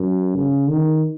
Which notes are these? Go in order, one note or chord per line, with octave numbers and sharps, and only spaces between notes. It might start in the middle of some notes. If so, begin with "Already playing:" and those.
Already playing: F#2
C#3
D#3